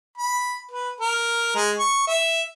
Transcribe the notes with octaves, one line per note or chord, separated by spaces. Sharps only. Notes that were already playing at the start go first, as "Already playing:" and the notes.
B5
B4
A#4
G#3
C#6
E5